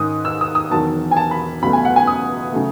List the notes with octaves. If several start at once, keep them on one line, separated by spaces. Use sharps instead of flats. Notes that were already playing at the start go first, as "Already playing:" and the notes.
Already playing: G#2 D#3 G#3 C#4 D#6
E6
D#6
D#6
E1 E2 D#3 F#3 A5
G#5
A5
B5
C#2 B2 F#3 A3 B5
G#5
F#5
G#5
D#6
C#3 F#3 A3